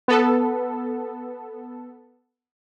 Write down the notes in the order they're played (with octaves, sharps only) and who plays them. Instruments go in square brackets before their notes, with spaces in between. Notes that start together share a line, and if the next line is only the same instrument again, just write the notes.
[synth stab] B3 A4